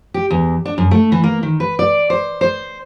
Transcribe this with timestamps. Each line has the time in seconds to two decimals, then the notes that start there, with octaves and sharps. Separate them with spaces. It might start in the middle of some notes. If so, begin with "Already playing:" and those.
0.14 G4
0.31 E2
0.65 D4
0.78 F#2
0.91 A3
1.12 E3
1.24 A#3
1.43 D#3
1.60 B4
1.79 D5
2.10 C5
2.41 C5